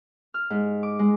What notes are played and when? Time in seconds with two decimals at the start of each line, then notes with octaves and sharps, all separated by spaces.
0.34 F6
0.50 G#2
0.83 D6
0.99 G#3